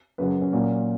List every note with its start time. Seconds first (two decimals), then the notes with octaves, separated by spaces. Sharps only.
0.18 F#2 C#3 F#3 B4
0.42 C#4
0.53 A#2 F#3 A#3